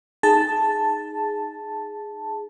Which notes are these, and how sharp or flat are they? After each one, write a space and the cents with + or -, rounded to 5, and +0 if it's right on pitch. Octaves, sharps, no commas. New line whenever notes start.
D#4 +0 G#4 +0 A5 +0